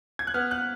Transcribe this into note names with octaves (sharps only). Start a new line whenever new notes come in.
G#6
F#6
B3 F6
F#6